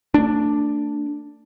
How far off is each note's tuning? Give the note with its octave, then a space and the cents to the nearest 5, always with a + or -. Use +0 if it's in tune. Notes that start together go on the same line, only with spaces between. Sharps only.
A3 +30 D4 +0